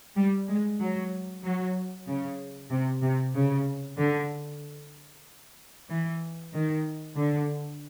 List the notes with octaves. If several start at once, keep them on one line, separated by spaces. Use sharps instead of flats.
G3
G#3
F#3
F#3
C#3
C3
C3
C#3
D3
E3
D#3
D3